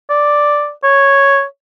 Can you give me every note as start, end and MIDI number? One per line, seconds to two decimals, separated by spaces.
0.10 0.70 74
0.84 1.43 73